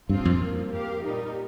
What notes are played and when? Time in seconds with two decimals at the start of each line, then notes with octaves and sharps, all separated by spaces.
0.09 G2 A#2 F3 C4 F4
0.25 F2
0.41 G2 F3 A#3
0.72 A#3 G4 A#4 F5
1.04 A#2 G3 D#4 G4 A#4